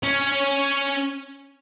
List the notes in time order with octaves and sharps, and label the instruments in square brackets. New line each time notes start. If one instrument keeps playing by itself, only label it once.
[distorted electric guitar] C#4